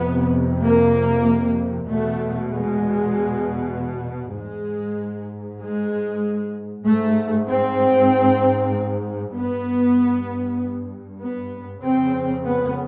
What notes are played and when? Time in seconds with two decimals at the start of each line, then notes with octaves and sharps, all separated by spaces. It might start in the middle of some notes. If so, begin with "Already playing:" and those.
Already playing: F2 C3 B3
0.63 A#3
1.87 E2 B2 A3
2.49 G#3
4.36 G#2 G#3
5.60 G#3
6.84 G#2 A3
7.47 C4
9.34 G2 B3
11.20 B3
11.82 F2 C#3 C4
12.45 B3